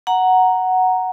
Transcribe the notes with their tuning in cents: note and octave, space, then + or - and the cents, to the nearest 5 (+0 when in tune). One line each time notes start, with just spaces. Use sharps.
F#5 +0 A#5 +0